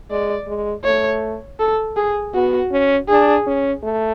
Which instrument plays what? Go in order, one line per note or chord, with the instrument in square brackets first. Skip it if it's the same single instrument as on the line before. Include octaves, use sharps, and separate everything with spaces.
[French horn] G#3 [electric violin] D5
[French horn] G#3
[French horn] A3 [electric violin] C#5
[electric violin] A4
G#4
[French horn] B3 [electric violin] F#4
[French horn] C#4
[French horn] D4 [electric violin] G#4
[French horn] C#4
A3